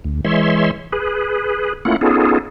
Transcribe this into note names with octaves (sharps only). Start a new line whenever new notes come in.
D2
E3 G#3 C#5 E5 C6
G#4 B4
A3 A#3 C#4 E4 F4 F#5
B3 C#4 D#4 F4 G#4 A4